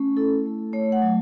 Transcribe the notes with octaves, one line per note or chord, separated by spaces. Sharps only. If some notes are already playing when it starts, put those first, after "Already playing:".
Already playing: A3 C#4
E4 A4
A3
A3 C#5
F#5
F#3